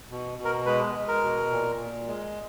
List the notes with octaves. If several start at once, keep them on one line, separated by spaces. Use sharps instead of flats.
B2
B2
A#4
G#3 B4
G#3
A#4
B2
A#2
A#2
G#3